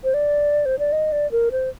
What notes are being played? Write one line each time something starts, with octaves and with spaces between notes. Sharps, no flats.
C5
D5
C5
D5
D#5
D5
A#4
C5